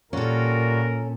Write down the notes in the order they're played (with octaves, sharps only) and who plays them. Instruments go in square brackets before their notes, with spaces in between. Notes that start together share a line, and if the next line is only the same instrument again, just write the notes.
[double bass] A#2 [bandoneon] G3 F4 F#4 [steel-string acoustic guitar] C#4 A4 [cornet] A#4